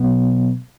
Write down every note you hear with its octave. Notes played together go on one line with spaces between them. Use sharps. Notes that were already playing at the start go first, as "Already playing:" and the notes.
Already playing: B2 F#3 B3